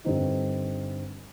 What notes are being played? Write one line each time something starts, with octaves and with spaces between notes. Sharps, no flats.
G2 D3 G3 C4 D#4